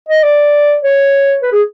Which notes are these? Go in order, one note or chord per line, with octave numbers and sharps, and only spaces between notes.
D#5
D5
C#5
B4
G#4